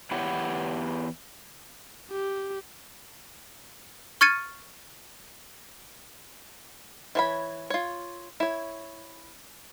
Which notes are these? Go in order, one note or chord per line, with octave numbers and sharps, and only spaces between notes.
E2 B3 E4 G4 C#5 F#5
G4
C#6 F6 G#6 A6 C#7 D#7
E3 C#5 B5
F4 C#5
E4 C#5